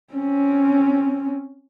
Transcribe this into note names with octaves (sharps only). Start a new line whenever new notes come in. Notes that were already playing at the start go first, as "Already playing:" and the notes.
C4 C#4